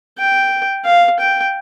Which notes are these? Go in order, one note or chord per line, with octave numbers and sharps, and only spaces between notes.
G5
F5
G5